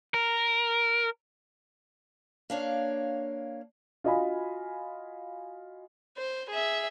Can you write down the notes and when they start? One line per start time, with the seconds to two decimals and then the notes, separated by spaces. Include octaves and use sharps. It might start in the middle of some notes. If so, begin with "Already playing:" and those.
0.14 A#4
2.50 A#3 D4 C#5 F5
4.04 F4 F#4 D#5 F5 G#5 B5
6.17 C5
6.50 G#4 E5